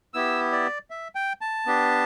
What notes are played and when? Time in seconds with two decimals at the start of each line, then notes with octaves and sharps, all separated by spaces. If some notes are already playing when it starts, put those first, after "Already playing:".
0.14 B3 E4 G4 E6
0.52 D5
0.90 E5
1.15 G5
1.41 A5
1.66 B3 D4 G4